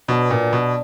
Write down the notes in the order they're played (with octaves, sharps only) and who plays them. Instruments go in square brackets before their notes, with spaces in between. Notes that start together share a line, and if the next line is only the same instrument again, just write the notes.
[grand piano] B2 [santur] F#3 B3 D4
[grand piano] A#2
B2